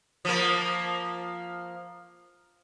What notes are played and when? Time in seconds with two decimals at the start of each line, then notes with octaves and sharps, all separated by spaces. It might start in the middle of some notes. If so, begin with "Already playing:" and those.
0.25 F3 A#3